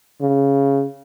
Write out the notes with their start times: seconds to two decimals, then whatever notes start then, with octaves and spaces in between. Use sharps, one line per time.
0.21 C#3